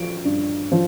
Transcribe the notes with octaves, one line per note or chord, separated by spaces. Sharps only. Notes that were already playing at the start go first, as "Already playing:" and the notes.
Already playing: F3 D7
G2
F3